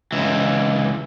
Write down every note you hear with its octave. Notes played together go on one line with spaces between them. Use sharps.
C#2 E3